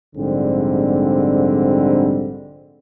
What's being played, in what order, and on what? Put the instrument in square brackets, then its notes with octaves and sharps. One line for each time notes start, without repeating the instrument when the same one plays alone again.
[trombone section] A#1 G#2 D3 G3 C4